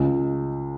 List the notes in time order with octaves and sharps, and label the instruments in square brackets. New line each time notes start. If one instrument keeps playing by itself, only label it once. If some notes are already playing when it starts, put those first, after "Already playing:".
Already playing: [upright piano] C#2 C#3 G#3